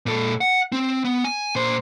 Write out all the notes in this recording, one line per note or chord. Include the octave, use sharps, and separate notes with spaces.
A#2 A4
F#5
C4
B3
G#5
A#2 C5